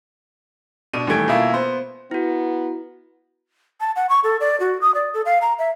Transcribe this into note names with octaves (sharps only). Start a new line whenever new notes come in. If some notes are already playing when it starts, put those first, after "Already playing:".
B2 D4 D#7
D#2 E3 G3 A3 G#6 D7
B2 A#3 E4 F4
B3 C5
B3 E4 F#4
A5
F#5
C#6
A4
D5
F#4
D#6
D5
A4
F5
A#5
E5